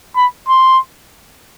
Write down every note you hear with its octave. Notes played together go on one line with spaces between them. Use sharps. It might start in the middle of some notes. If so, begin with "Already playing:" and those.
B5
C6